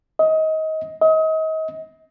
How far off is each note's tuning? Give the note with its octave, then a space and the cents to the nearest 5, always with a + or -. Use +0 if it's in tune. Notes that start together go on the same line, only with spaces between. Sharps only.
D#5 +25
D#5 +35